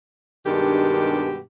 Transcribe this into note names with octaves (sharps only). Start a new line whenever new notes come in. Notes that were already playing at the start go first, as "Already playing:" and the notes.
G2 B2 D#3 G#3 D4 G4